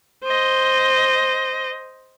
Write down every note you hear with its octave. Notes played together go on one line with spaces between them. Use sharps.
C5 D#5